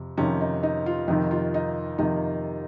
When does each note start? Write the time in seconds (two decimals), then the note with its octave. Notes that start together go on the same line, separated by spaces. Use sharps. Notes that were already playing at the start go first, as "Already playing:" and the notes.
Already playing: F2 C3
0.18 F2 C3 D#3 C#4
0.41 D#4
0.63 D#4
0.86 F4
1.08 F2 C3 D#3 D#4
1.31 F4
1.54 D#4
1.98 F2 C3 D#3 D#4